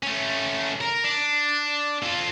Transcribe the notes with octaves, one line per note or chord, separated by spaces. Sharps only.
A3 C#4
A#4
D4
F4 A4